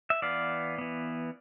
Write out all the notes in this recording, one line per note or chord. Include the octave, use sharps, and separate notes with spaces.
E5
E3 B3 D5 F5
E3 B3